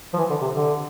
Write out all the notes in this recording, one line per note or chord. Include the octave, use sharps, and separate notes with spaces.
F3
E3
D3
C3
D3